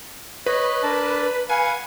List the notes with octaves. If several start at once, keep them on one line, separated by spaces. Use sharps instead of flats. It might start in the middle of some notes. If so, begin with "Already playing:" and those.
B4 C#5 D#5
D4 A#4 A5
B4 F5 F#5 G#5